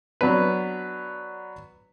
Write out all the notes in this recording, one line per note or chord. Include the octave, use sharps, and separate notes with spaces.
F#3 B3 D4 B4